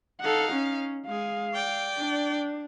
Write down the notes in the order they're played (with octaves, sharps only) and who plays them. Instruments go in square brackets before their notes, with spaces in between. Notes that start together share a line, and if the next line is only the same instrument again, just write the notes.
[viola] D#4 F5 [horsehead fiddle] A4 F#5
[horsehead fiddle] C#4
[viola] G#3 G#4 [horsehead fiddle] F5
[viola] D5 G5
[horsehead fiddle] D4